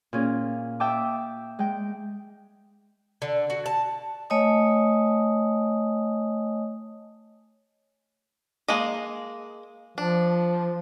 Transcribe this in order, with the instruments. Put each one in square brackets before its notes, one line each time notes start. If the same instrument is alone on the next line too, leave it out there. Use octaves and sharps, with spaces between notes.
[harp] A#2 C#4 G#4
E5 G5 A5 D6 D#6
G#3 G5
[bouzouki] D3
F#4
A5
[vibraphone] A3 C#5 D#5 G#5 D#6
[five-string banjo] G#3 A#3 D#5
[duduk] F3 [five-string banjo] D4